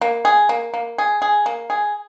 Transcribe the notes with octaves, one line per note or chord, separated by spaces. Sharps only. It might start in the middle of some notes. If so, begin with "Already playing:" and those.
A#3
G#4
A#3
A#3
G#4
G#4
A#3
G#4